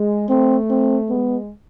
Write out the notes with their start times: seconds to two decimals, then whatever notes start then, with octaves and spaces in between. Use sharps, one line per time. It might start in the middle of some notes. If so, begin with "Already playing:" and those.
Already playing: G#3
0.29 A3 C4
0.70 C4
1.09 G#3 B3